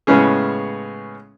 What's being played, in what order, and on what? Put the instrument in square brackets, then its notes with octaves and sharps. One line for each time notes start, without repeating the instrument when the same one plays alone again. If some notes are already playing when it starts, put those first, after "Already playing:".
[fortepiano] A2 C#3 G#3 B3 C#4 G#4